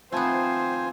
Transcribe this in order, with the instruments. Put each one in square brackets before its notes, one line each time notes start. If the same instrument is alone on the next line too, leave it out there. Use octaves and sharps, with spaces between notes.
[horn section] D#3 F3 C5 [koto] A3 B3 [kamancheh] C4 [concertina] F4 G#5